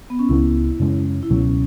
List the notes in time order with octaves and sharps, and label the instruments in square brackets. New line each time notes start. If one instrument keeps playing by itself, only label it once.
[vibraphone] B3
C#4
[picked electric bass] C#2 C#3 G#3 B3 [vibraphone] E4
[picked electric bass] F#2 C#3 G#3 C#4
[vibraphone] E4
[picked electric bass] C#2 B2 F#3 [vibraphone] C#4